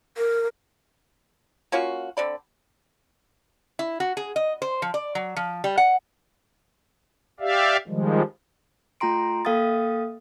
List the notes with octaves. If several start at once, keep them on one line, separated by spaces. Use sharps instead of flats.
A#4
A#3 C#4 F4 F#4
D3 C4 D5 B5
E4
F#4
G#4
D#5
C5
F3
D5
F#3
F3
G3
F#5
G4 D5 E5 F5
D#3 F3 G3 G#3
A3 F4 G5 A#5 C6 D7
A#3 A4 F5 G5 D#6 A6